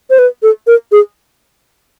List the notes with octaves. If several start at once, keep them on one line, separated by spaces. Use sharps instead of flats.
C5
B4
A4
A#4
G#4